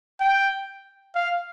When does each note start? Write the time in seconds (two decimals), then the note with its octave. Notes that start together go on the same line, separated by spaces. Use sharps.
0.20 G5
1.15 F5